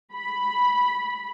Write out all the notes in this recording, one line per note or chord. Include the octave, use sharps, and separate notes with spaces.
B5